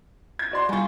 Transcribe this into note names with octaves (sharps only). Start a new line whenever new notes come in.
G#6
F#4 D5 C6
G3 F4 G#5 C#6